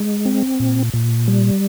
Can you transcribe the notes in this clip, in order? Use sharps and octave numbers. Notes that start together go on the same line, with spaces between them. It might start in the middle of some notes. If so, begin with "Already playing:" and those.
Already playing: G#3
C4
A#2
A#2
G3